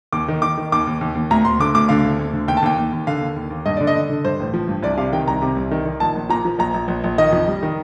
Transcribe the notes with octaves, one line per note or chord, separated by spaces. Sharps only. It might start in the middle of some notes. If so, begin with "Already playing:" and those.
D#2 D6
D#3
D#3 D6
D#3
D#2 D6
D#2
D#2
D#2
D2 A#5
D2 C6
D3 D6
D2 D6
D3 F5
D2
D2
D3
D#2 G5
A5
D#2 G5
D#2
D#2
D3 F5
D#2
D#2
D#2
G2 D#5
D3 D5
D#5
D3
D3
G2 C5
A1
F3
G2
C2 D5
C3 F5
D#3 G5
C2 A#5
C3
C2
D#3
D#3
A#1 A5
A#1
A#2 A#5
F3
A#1 A#5
A#1
A#1
A#1
D#3 D#5
F2
G3
D#3